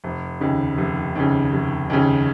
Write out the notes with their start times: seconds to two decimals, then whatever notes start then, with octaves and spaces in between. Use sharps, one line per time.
0.04 F1
0.40 D#2 C#3
0.78 F1
1.16 D#2 C#3
1.52 F1
1.90 D#2 C#3